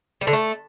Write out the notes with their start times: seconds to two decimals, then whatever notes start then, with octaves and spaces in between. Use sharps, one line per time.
0.21 G3
0.27 D3
0.33 A3